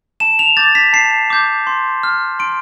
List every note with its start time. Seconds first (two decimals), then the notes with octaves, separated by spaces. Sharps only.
0.20 A5 E7
0.39 F7
0.57 D6 G6 A6
0.75 B6
0.93 A5 C7
1.30 D6 G6
1.67 C6
2.03 F6
2.39 C6 D7